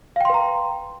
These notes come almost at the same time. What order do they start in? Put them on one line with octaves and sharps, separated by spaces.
F5 G5 C6 B4 A#5